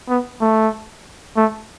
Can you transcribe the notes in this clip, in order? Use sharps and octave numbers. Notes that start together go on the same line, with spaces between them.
B3
A3
A3